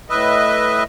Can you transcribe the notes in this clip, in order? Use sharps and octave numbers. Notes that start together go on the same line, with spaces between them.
A2 B4 D#5 E5